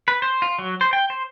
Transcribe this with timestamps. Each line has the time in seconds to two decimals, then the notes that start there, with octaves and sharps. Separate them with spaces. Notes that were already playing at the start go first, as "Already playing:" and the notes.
0.08 B4
0.22 C5
0.42 F4
0.59 F#3
0.81 C5
0.93 G5
1.10 C5